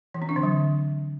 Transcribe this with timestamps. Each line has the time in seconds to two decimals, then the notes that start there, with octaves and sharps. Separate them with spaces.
0.14 E3
0.22 C4
0.29 D4
0.36 D3
0.43 F#3